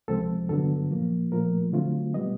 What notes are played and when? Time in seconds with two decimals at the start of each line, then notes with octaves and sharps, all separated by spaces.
0.08 C#2 C3 F3 G#3 C4 A4
0.49 G2 D3 F#3 B3 A4
0.91 A#2 F3 A#3
1.32 A#2 F3 A3 A#4
1.73 D3 F#3 A3 C4 F4
2.14 B2 G3 B3 D#5